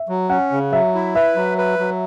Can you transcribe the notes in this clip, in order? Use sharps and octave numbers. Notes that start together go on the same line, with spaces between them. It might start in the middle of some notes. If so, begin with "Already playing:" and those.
Already playing: E5
F#3
C#4 F#5
C#3
F#3 E5
E4
B4 E5
F#3
B4
F#3